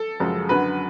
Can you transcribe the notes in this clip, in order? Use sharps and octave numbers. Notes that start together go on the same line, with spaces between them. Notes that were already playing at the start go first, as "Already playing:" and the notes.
Already playing: A4
F#2 C#3 F3 G#3
F#2 D3 F#3 B4